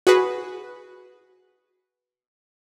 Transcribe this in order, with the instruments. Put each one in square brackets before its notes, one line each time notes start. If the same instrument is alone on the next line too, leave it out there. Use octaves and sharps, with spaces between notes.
[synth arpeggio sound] F#4 G#4 B4